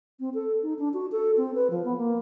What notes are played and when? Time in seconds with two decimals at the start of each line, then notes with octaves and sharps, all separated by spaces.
0.20 C4
0.34 A4
0.63 D#4
0.79 D4
0.94 F#4
1.12 A4
1.37 C4
1.55 B4
1.70 F3
1.85 B3
1.97 A#3